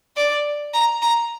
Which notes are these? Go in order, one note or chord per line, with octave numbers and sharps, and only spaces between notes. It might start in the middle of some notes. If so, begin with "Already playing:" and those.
D5
A#5
A#5